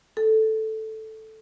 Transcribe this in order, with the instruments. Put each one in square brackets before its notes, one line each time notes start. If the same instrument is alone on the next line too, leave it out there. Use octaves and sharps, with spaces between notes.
[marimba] A4